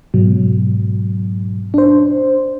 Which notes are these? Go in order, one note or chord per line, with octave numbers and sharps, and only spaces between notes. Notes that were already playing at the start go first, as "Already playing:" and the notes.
G#2 B2 F#3
D4 C5